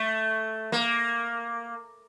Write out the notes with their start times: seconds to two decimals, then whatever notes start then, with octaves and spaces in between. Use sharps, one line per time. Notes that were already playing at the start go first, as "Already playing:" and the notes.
Already playing: A3
0.72 A#3